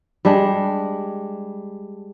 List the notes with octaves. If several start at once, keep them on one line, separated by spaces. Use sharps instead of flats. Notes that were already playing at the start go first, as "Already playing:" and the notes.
G3 G#3 D4